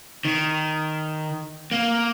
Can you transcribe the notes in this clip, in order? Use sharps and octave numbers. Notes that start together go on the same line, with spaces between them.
D#3
A#3